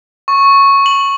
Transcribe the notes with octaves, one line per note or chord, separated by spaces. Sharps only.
C#6
F#7